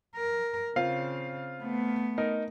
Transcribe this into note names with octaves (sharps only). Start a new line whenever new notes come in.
A#4
C#3 C4 F4 F5
A3 B3
D#4 A#4